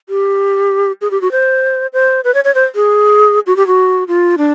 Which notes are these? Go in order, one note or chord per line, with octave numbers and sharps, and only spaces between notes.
G4
G#4
G4
F#4
C5
C5
B4
C#5
C#5
C5
G#4
F#4
G4
F#4
F4
D4